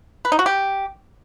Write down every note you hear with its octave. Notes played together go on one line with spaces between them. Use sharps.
B4
D#4
F#4
G4